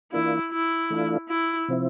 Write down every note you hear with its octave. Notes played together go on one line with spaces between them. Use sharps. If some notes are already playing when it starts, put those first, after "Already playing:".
E3 A#3 D4 E4 F4
E4
E3 A3 D4 F4
E4
C3 F3 C4 E4